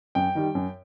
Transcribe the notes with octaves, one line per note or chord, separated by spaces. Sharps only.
F#2 G5
D#3 G3
F#2